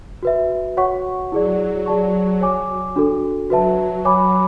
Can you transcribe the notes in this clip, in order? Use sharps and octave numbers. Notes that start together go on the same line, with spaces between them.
F#4 B4 E5
F#4 C#5 F#5 C#6
F#3 E4 G#4 D5
G#4 D5 A5 C#6
C#5 G#5 D6
D4 F#4 A4
F#3 F#4 B4 E5 A5
C#5 G#5 B5 D6